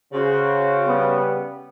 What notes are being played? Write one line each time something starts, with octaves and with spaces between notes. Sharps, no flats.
C#3 F#4 C5
G3 B3